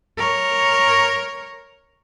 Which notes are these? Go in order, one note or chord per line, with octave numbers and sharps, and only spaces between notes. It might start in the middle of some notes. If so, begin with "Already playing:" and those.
A#4 C#5